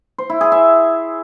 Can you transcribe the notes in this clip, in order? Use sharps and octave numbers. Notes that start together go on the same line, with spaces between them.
C5
E4
G#4
E5